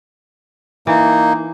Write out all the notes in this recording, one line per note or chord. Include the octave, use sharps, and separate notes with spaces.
E3 A#3 D#4